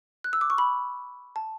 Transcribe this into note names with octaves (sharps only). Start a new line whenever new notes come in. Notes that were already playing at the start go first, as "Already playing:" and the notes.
F#6
E6
D6
C#6
B5
A5